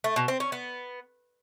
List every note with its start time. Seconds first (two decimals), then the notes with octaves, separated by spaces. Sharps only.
0.04 A3
0.16 B2
0.28 C4
0.40 C#4
0.52 B3